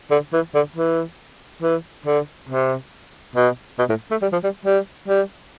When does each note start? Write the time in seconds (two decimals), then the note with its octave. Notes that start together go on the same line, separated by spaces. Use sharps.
0.11 D3
0.33 E3
0.54 D3
0.76 E3
1.62 E3
2.06 D3
2.49 C3
3.35 B2
3.79 B2
3.89 A2
4.11 A3
4.22 G3
4.32 F3
4.43 G3
4.65 G3
5.08 G3